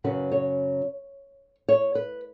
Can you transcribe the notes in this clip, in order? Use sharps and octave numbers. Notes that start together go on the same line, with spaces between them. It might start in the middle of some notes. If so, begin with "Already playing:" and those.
F#2 C#3 F#3 C#4 B4
C#5
C#5
B4